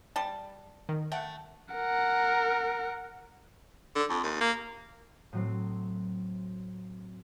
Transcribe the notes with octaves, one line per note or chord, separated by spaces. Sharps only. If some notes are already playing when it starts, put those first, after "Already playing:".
G3 A5
D#3
A3 F#5 G5
A#4 F#5
D3
F2
D#2
A#3
A2 F#3 C4